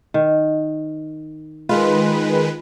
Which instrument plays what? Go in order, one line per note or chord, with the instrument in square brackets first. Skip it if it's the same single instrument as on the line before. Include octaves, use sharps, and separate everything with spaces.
[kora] D#3
[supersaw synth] D#3 G#3 B4 [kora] F4